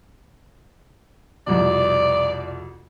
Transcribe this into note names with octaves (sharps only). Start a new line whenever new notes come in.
C2 F2 B2 D5